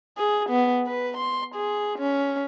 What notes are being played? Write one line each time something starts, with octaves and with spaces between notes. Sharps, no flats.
G#4
B3
B4
C6
G#4
C#4